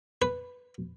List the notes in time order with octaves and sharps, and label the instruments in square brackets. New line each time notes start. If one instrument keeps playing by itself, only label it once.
[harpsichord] B4